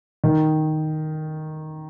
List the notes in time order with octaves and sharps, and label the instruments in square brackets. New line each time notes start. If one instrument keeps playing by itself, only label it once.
[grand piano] D#3